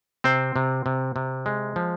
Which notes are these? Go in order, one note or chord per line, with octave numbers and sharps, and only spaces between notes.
C3 C4 C5
C3
C3
C3
G#3
F3